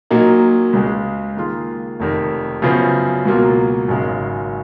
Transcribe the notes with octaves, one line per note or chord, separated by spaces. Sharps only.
A#2 F#3 A#3 D#4
C#2 C#3 G#3
D#3 A#3 F4 G#4
F1 F2 D#3
F#2 C#3 F3 B3
C#2 B2 F#3 A#3 F4
G#1 F#2 C#3 G#3